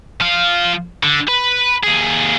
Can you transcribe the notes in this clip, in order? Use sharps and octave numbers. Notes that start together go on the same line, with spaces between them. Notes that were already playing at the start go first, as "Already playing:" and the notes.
F3 F5
D3
B4
D#2 G#4